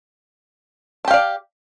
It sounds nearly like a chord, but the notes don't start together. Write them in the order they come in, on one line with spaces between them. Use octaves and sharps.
A5 G4 F5 D5